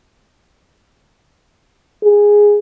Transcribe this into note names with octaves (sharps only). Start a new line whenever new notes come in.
G#4